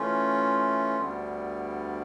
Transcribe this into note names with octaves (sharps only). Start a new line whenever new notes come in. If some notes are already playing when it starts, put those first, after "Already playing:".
Already playing: E3 A3 C#4 F4
D2 D3 G3 B3